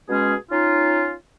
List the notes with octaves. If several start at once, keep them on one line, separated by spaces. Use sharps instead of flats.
B2 G#3 C#4 G#4
C#4 D#4 F4